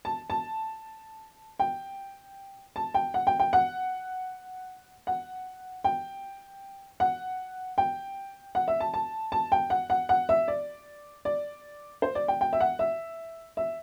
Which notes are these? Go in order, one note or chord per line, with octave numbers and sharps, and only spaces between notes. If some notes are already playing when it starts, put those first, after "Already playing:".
A5
A5
G5
A5
G5
F#5
G5
G5
F#5
F#5
G5
F#5
G5
F#5
E5
A5
A5
A5
G5
F#5
F#5
F#5
E5
D5
D5
C5
D5
G5
G5
E5
F#5
E5
E5